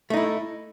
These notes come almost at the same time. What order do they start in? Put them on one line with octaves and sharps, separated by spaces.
A3 D#4 E4